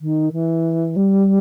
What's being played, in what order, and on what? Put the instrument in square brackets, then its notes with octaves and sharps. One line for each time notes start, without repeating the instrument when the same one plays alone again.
[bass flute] D#3
E3
G3